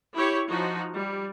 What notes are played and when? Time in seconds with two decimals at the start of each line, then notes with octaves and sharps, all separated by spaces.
0.14 E4 G4 C#5
0.48 F3 D#4 F#4
0.95 G3